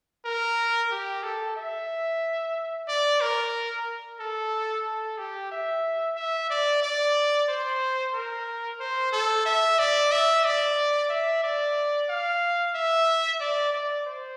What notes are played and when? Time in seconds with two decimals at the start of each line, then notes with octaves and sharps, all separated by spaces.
0.25 A#4
0.91 G4
1.23 A4
1.56 E5
2.88 D5
3.21 A#4
4.20 A4
4.85 A4
5.18 G4
5.51 E5
6.16 E5
6.50 D5
6.83 D5
7.49 C5
8.14 A#4
8.80 C5
9.12 A4
9.45 E5
9.78 D5
10.12 E5
10.44 D5
11.10 E5
11.43 D5
12.09 F5
12.74 E5
13.40 D5
13.73 D5
14.06 C5